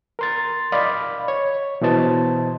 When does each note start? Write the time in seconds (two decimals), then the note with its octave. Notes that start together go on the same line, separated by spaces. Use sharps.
0.19 A#4 C6 A6
0.72 D5 D#5 F5 B5
1.28 C#5
1.81 B2 E3 C5 D#5 A5